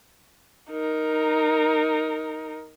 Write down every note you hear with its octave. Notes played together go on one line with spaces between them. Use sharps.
D#4 A#4